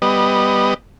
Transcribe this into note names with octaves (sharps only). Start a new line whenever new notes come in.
G3 B3 D#5